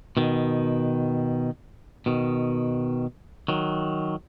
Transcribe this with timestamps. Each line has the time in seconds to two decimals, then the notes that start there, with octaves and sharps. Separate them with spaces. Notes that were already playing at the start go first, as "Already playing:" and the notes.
0.17 B2 D#3
2.06 B2 D#3
3.48 D#3 F#3